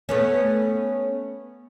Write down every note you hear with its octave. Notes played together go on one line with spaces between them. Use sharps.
A3 B3 C#4